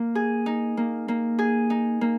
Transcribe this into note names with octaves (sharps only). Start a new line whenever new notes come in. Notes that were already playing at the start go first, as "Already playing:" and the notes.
Already playing: A#3
G#4
D#4
A#3
A#3
G#4
D#4
A#3